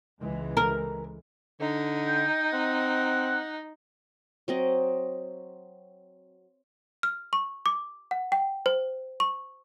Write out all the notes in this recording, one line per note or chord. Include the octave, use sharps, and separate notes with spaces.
C#2 E3 G#3
A#4
D3 D#4
G5
C4 F#5
F#3 C4 D#5
F6
C#6
D6
F#5
G5
C5
C#6